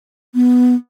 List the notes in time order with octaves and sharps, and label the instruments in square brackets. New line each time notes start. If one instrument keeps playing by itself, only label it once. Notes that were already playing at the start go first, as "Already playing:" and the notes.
[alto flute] B3